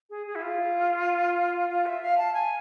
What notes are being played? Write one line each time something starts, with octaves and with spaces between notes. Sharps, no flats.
G#4
G#4
E4
F4
F4
E5
F5
A5
G#5